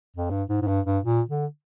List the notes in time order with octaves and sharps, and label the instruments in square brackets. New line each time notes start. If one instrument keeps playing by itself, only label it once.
[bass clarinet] F2
G2
G#2
G#2
G2
G2
A#2
D3